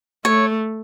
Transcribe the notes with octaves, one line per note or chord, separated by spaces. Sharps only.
A3 C#5